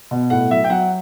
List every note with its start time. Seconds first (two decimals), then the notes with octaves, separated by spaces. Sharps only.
0.11 B2
0.30 A2 F#5
0.50 F#3 E5
0.64 G5
0.70 F#3 F#5